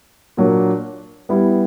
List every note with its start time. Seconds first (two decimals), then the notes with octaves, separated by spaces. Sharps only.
0.37 A#2 F#3 A#3 D4
1.29 G3 B3 E4